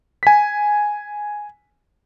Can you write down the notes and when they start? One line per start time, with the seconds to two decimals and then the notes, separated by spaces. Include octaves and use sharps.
0.23 G#5 B6